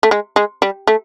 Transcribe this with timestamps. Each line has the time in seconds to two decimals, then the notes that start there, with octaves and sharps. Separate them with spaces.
0.03 A3
0.11 G#3
0.36 G#3
0.62 G3
0.87 A3